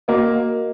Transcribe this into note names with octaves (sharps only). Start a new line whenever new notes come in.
A#3 F#4 A#4 D#5